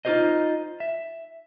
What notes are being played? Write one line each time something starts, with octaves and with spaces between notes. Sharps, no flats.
D#4 F4 G4 G#4 C5 D#5
E5